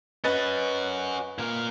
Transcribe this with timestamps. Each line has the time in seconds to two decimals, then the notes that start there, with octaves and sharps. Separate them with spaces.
0.24 C#4 F#4 B4 D#5 A6
1.39 A#2 A#4